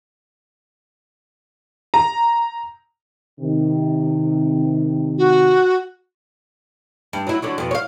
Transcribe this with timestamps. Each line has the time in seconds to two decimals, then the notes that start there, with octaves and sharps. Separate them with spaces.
1.94 A#5
3.40 C3 D#3
5.18 F#4
7.13 G2
7.27 F#3 E4
7.42 D3 F#3 F#4
7.58 F2 B2
7.71 C#5 F5